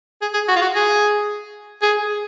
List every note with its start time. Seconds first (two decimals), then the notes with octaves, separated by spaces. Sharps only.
0.22 G#4
0.34 G#4
0.48 F#4
0.56 F4
0.62 F#4
0.75 G#4
1.82 G#4